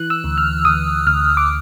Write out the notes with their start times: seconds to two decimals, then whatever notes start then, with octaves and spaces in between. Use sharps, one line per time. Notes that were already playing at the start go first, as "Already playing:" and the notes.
Already playing: E3 F#6
0.10 E6
0.24 D2
0.38 F6
0.65 D2 D#6
1.07 D2 F6
1.37 D6